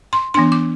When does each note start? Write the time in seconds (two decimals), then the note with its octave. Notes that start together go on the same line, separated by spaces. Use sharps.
0.13 C6
0.34 E3 B3 D4 C6
0.52 D6